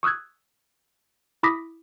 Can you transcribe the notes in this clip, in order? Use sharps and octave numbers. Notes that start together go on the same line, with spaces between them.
C#6 D#6 E6 F#6 G#6
E4 B5 D6 D#6 A#6 B6